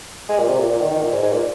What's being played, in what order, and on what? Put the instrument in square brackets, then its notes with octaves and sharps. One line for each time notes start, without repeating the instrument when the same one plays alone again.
[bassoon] G#3
A#2
C3
A#2
A#2
D#3
D#3
A#2
G#2
G#2
A#2